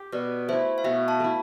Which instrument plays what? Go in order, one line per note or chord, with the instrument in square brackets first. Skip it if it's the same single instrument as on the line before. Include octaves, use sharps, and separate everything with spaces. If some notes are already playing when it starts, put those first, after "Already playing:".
Already playing: [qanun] G4
[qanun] B2 [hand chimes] B4 D5
[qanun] A3 E4 [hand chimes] C5 E5
[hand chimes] F5
[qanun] B2 [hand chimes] E5 G5
[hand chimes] F5 A5
[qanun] A3 E4